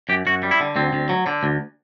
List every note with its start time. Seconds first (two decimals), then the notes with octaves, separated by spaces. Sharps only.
0.09 F#2 G4
0.26 F#2 F#4
0.43 G3
0.51 E4
0.60 D3
0.76 D2 C4
0.93 D2
1.09 F#3
1.27 D3
1.43 D2